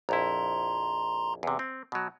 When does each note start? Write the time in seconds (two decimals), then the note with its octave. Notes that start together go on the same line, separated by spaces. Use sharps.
0.09 A#1 F2 E4 A#5 C6
1.43 E2 C3
1.59 C4
1.92 B2 F#3